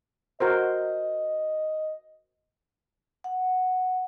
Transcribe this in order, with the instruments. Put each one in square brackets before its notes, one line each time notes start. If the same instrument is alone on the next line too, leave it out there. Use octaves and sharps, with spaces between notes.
[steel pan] F#4 A#4 C5 [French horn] D#5
[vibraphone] F#5